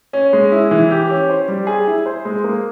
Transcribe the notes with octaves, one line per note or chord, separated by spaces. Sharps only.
C#4
G#3
E4
E3
G4
C#4
C5
G3
G#4
E4
C5
G#3
A#3